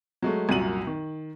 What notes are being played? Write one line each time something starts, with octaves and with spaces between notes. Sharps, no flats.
F#3 G#3 A3
C2 F#2 A#2 F#4 D#7 F#7
D#3